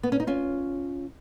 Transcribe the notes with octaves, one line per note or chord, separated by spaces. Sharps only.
B3
C#4
D#4
C#4 F4